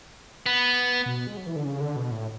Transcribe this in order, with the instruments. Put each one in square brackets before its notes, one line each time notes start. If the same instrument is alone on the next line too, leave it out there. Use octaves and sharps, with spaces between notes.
[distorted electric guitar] B3
[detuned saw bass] B2
G#3
F#3
E3
D3
C#3
D3
B2
A2